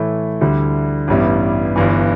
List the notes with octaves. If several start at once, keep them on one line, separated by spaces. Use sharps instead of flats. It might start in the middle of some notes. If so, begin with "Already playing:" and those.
Already playing: A2 E3 A3 E4
D2 D3 G3 E4
A1 G2 G3 B3 E4
G1 G2 E3